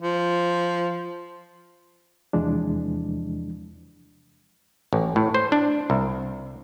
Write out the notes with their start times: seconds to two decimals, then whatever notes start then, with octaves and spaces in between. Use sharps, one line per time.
0.01 F3
2.33 E2 C3 E3 F3 G#3 D4
4.93 A1
5.16 A2
5.34 C5
5.52 D4
5.90 C2